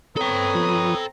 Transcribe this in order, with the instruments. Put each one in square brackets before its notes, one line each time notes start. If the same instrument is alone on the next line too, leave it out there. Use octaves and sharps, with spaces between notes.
[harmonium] C4 A#5 [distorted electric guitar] A4 G5 [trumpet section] B4 C#5 D#6
[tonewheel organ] F3